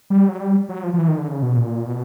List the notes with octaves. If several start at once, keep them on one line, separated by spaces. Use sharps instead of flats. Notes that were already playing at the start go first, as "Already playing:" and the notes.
G3
F#3
G3
F#3
F3
F3
E3
D#3
D3
C#3
B2
A#2
B2